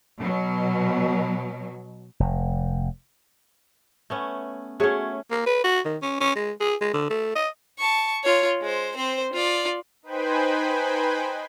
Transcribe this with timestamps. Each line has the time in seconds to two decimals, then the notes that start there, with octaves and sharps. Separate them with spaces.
0.20 B2 F#3
2.20 F1
4.10 A3 B3 C#4
4.80 A3 C#4 F#4 G#4 C#5
5.31 A#3
5.46 B4
5.64 F#4
5.85 D#3
6.02 C#4
6.20 C#4
6.35 G#3
6.60 G#4
6.81 G#3
6.93 D3
7.10 A3
7.36 D#5
7.79 A5 C#6
8.24 F4 C#5
8.61 G#3 C5
8.96 C4 C5
9.33 F4 D5
10.03 D#4 B4 C5 G5 G#5 B5